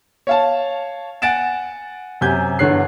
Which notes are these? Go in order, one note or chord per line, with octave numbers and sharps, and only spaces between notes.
C#5 F5 A5
F#5 G#5 A6 D7 E7
F#2 C3 G4 G#5 G6 G#6
G1 E2 D3 C#5 F#6 C7